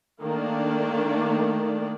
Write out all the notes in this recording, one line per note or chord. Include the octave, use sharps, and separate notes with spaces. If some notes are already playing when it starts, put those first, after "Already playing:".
D#3 A3 A#3 D4 D5